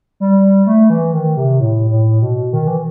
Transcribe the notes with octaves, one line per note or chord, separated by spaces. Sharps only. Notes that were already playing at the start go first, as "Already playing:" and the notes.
G3
A3
E3
D#3
C3
A2
A2
B2
D#3
E3